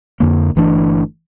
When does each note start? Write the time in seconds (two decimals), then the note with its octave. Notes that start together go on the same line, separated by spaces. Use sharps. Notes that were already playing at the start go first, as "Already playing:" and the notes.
0.20 F2 D3 A#3
0.56 G1 E3 A3 D4